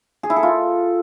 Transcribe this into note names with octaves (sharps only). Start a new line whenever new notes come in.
G#4
E4
A4
F4